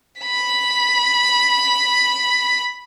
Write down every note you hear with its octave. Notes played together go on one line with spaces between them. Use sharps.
B5 B6